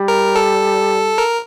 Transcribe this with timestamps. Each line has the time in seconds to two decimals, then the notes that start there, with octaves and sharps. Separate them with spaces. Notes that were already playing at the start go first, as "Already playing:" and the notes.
Already playing: G3
0.08 A#4
0.36 A4
1.18 A#4